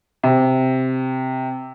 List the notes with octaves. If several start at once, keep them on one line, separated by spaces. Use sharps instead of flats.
C3